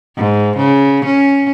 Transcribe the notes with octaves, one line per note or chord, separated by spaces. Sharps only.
G#2
C#3
C#4